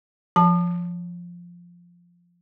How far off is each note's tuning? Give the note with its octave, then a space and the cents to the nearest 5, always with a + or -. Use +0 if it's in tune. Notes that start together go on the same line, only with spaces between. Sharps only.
F3 +0 A5 +0